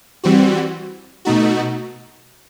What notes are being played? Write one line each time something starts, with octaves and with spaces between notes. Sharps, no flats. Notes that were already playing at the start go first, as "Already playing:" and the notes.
E3 G3 C4 F#4
B2 A3 D#4 F#4